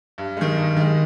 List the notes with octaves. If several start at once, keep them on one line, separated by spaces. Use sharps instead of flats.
G2
D#3 G#3
G2
D#3 G#3